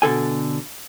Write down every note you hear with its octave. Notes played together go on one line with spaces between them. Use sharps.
B2 D3 A4 G#5